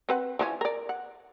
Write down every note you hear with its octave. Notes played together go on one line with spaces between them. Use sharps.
C4 B4 F#5
E3 F3 C#4
A#4 D5
F#5